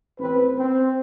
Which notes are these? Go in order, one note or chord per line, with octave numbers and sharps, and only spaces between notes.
A1 C4 B4
C4